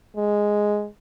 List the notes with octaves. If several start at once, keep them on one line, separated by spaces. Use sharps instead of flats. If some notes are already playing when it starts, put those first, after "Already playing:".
G#3